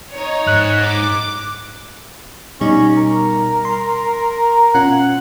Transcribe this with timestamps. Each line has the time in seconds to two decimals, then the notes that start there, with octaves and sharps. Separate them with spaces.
0.11 D#4 C#5
0.47 G#2 F#6
0.82 D6
2.61 B2 G3 C#4 D#4
2.97 A#4
3.65 C6
4.74 B2 C#4 F4 F#5